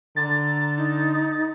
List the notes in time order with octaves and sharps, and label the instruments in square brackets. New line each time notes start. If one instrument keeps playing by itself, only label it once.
[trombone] D3 [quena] A#5 [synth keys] A6
[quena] D#4